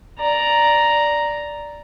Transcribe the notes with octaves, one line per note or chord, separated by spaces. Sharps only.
D5 A#5